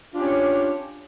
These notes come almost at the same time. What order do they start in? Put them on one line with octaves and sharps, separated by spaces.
D4 F4 G4 C#4 C#5